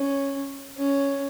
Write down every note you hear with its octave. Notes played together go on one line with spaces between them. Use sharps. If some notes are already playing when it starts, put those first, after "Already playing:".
Already playing: C#4
C#4